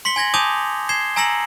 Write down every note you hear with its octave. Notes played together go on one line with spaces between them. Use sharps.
C6 B6 C#7 G7
G#5 G#6 A#6 F#7
G#5 A5 D6 D#6 G6 F7
G#6 C7 E7 G7
G#5 A#5 E6 A#6 C#7 F#7